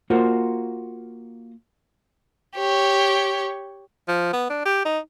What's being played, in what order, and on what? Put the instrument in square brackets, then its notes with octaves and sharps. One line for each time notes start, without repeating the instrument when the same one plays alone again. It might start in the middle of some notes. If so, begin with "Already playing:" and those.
[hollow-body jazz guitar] A#3 F4 F#4 A#4 C5
[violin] G4 C#5
[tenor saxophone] F3
B3
D4
G4
D#4